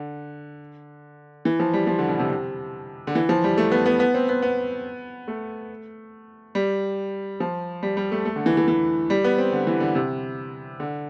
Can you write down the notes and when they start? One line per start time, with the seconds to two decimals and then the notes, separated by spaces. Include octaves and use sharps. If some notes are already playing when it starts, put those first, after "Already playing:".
Already playing: D3
1.45 E3
1.60 F3
1.73 G3
1.87 F3
1.99 D3
2.08 B2
2.19 C3
2.30 C3
3.07 D3
3.15 E3
3.29 F3
3.44 G3
3.58 A3
3.72 B3
3.86 B3
4.00 B3
4.14 C4
4.29 B3
4.42 B3
5.28 A3
6.55 G3
7.40 F3
7.83 G3
7.97 G3
8.12 A3
8.25 A3
8.36 D3
8.46 E3
8.57 E3
8.68 E3
9.10 G3
9.24 B3
9.38 C4
9.52 D3
9.67 E3
9.80 D3
9.95 C3
10.80 D3